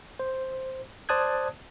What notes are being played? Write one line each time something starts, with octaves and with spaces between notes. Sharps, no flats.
C5
C5 D5 A5 D#6 F#6 G#6